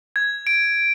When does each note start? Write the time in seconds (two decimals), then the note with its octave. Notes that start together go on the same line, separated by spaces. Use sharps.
0.16 G#6
0.47 D7